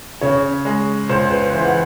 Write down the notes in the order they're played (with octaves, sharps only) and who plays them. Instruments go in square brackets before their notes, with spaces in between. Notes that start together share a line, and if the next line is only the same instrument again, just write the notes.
[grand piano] C#3 [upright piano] C#5
[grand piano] G#3
[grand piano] C#2 [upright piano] C5
[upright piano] B4
[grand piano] E3 [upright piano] C5
[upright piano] F#5